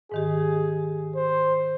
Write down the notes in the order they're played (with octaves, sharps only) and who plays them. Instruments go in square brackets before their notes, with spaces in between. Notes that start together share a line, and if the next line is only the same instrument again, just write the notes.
[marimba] G#2 D#3 G4 [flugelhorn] G#4
[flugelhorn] C5